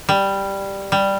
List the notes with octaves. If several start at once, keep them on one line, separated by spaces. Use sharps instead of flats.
G3
G3